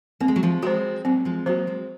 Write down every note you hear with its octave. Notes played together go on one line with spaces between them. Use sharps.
A#3 C4
G#3
F#3
F3 G#3
G#3 C4 F#4 C5
F#3 A#3 C4
F3 G#3
F#3 A#3 F#4 C5
G#3 C4